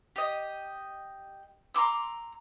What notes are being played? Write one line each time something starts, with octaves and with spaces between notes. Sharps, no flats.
G4 D#5
A#5 C6 D6 E6